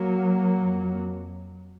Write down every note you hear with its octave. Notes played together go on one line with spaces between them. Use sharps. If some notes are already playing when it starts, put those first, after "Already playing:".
Already playing: F#3 A#3
F2